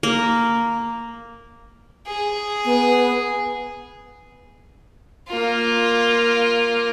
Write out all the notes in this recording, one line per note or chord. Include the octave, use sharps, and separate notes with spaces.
A#3
G#4
B3
A#3 F4